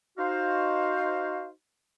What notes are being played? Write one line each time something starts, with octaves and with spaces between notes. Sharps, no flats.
D#4 F#4 C5 F5